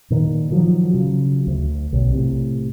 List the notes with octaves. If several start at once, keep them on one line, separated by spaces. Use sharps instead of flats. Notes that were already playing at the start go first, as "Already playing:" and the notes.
A#2 D#3
D#3 F3 F#3
C#3 F#3
D2
B1
A2 C3